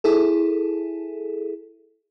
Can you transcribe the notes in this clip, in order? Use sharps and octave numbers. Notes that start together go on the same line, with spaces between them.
E4 G#4 A4